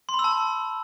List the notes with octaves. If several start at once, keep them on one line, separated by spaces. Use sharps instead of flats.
C6
B5
E6
A5